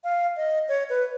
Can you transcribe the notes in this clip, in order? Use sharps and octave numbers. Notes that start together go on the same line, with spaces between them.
F5
D#5
C#5
B4